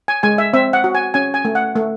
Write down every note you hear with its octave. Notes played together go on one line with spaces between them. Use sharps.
G#5
G#3 G#5
E5
C4 E5
F#5
F#4
G#5
C#4 G#5
G#5
A3
F#5
A3